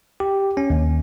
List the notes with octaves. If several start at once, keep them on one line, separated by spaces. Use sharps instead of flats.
G4
C#4
D#2